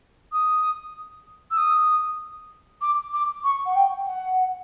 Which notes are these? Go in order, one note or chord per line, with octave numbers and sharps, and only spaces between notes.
D#6
E6
D#6
D6
D6
C#6
F#5
G5
F#5